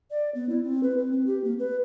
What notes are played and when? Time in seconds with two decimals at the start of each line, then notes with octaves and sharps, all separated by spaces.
0.11 D5
0.35 B3
0.49 E4
0.64 C4
0.83 B4
0.98 C4
1.12 C4
1.26 G4
1.44 A#3
1.59 B4